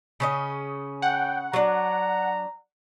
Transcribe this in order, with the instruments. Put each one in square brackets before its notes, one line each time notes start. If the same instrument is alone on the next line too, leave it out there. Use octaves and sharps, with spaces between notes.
[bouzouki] C#3 C#4 D#5
[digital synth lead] F#5 [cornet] G5
[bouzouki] F#3 D4 [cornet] A#5